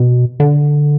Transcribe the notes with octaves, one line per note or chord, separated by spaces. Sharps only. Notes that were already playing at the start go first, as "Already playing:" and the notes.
Already playing: B2
D3